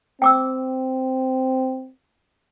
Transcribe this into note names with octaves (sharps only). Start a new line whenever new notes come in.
C4 G5 D6 E6